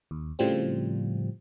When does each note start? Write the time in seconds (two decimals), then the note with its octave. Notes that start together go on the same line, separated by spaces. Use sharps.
0.11 D#2
0.39 A2 C#3 F3 G3 C4